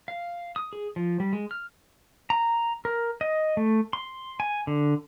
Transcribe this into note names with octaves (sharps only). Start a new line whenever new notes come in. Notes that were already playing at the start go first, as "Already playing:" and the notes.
F5
D#6
G#4
F3
G3
G#3
F6
A#5
A#4
D#5
A3
C6
G#5
D3